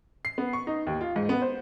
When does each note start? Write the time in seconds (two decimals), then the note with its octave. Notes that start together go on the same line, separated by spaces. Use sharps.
0.25 C7
0.38 B3
0.53 C#6
0.67 D#4
0.87 D#2
1.01 F4
1.16 G#2
1.29 B3
1.42 C5